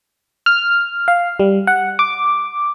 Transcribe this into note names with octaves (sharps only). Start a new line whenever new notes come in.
F6
F5
G3
F#5
D6